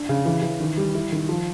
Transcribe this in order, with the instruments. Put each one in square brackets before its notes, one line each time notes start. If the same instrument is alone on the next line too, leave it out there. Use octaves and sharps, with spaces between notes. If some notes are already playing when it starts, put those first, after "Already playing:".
Already playing: [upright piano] D4
C#3
E3
E3
D#3
G3
E4
D#3
F3